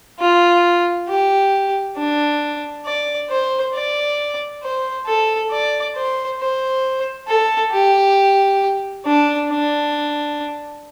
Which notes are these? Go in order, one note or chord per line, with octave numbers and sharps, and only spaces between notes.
F4
G4
D4
D5
C5
D5
C5
A4
D5
C5
C5
A4
G4
D4
D4